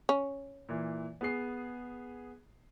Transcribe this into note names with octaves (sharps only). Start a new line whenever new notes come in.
C#4
A#2 E3
B3 G#4 C7